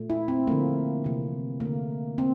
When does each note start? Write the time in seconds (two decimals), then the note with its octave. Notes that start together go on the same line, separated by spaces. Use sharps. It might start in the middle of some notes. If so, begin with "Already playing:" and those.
Already playing: A#2 A3
0.10 E4
0.28 C4
0.47 D3 F3 A3 A#3
1.04 C3 E3 A#3
1.60 D3 A3 A#3
2.18 A#3 C4